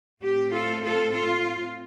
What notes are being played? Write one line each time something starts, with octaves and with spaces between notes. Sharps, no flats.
A2 A3 C4 G4
F4 A4
F4 A4
F4